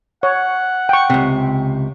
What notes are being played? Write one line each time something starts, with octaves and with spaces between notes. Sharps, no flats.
C#5 F#5
G5 C#6
C#2 C3